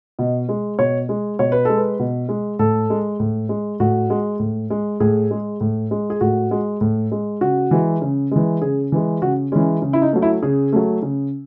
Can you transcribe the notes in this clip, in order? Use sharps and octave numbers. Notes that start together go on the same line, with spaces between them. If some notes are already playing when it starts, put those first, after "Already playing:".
B2 D#5
G#3
B2 C#5
G#3
B2 C#5
B4
G#3 A4
B4
B2
G#3
A2 A4
G#3
A2
G#3
A2 F#4
G#3
A2
G#3
A2 G#4
G#3
A2
G#3
G#4
A2 F#4
G#3
A2
G#3
C#3 F#4
E3 G#3
C#3
E3 G#3
C#3 G#4
E3 G#3
C#3 F#4
E3 G#3 C#4
C#3
E4
D#4
F#3 A3
E4
C#3 G#4
F#3 A3
C#3